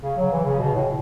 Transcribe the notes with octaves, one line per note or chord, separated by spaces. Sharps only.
C#3
F#3
E3
C#3
B2
A2